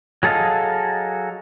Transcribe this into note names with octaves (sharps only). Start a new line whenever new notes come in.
F#3 G#4 A4 D#5 F5